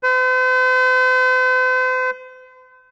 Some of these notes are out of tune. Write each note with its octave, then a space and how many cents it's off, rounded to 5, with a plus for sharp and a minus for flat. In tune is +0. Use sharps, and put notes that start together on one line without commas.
C5 -45